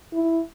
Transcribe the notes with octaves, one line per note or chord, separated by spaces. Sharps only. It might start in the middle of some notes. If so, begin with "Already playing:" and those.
E4